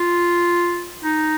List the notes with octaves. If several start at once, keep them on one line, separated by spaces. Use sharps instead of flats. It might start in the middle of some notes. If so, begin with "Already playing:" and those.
Already playing: F4
D#4